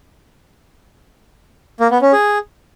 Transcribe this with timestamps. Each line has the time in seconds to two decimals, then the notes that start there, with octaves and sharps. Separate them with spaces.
1.80 A#3
1.91 B3
2.02 C#4
2.13 G#4